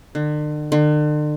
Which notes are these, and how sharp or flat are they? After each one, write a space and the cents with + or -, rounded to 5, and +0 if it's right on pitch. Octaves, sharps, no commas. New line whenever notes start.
D3 +40
D3 +40